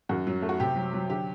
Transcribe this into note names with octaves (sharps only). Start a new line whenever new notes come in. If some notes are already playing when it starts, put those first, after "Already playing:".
F#2 F#4
F#3
A3
F#4
C3 G4
F#3
F#3
D3 G4